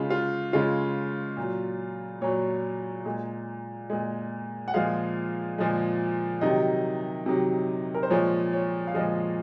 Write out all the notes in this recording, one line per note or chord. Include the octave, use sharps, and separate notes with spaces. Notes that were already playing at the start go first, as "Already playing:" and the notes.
Already playing: C#3 G#3 F4
F4
C#3 G#3 F4
A#2 F#3
A#2 F#3 C#5
A#2 G#3
A#2 G#3
F#5
A#2 F3 G#3 F5
A#2 F3 G#3
C3 D#3 F#3 D#5
C3 D#3 F#3
A#4
C5
A#2 F3 G#3 C#5
C#5
F5
A#2 F3 G#3 D#5